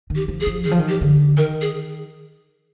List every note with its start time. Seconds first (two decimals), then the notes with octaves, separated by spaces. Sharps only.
0.10 D#3
0.16 G4
0.28 F3
0.41 G#4
0.47 F3
0.65 D#3 G#4
0.71 F3
0.79 D#3
0.88 G4
1.01 D3
1.37 D#3 A#4
1.62 G#4